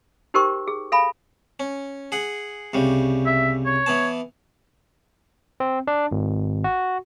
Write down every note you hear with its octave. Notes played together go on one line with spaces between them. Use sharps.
D#4 G4 A#4 C5 G5 C#6
G#4
A4 F5 G#5 B5
C#4
G#4 F#5
C2 C#3 G3
E5
C#5
E3 B3 A5
C4
D4
G#1
F#4